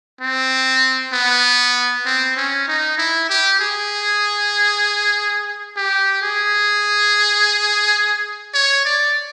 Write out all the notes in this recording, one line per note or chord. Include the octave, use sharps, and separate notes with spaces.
C4
B3
C4
C#4
D#4
E4
G4
G#4
G4
G#4
C#5
D5